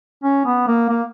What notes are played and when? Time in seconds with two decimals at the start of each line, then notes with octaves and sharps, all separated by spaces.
0.24 C#4
0.45 B3
0.68 A#3
0.90 A#3